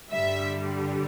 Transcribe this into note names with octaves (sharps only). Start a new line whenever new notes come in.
G2 D3 G3 E5